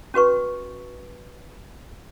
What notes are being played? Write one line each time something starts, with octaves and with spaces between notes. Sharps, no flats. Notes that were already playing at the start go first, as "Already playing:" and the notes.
C#4 F#4 B4 C#6